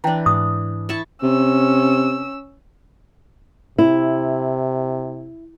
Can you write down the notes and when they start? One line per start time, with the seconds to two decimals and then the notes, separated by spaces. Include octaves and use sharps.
0.04 E3 D4 G5 A5 A#5
0.26 G#2 D#6
0.89 E4 A5 C#6
1.23 C3 C#4 E6
3.78 C3 E4